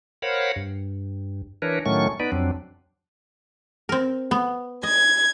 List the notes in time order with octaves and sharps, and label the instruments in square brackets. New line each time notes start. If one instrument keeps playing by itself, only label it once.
[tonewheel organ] A#4 C5 C#5 F5 F#5 B5
G2
E3 D4 A#4 B4 C#5
A2 D#3 F#3 A3 C#4 C#6
B3 D#4 B4 D5
F2 F#3 C4 D4
[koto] C4 A#4
B3
[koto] D#5 [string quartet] G#6